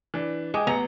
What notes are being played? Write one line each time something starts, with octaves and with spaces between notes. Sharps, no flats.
E3 D4
G#3 G5 D6 D#6
A1 B3 A#5 C#7